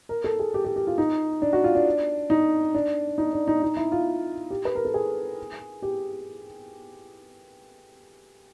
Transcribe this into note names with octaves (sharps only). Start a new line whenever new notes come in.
A#4
A4
G#4
G4
G4
G4
F4
D#4
D4
F#4
F4
D4
D#4
D4
D#4
D4
D#4
D#4
E4
F4
G4
B4
A#4
A4
G#4
G4